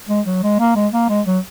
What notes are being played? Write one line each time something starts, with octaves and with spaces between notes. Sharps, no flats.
G#3
F#3
G#3
A#3
G#3
A#3
G#3
F#3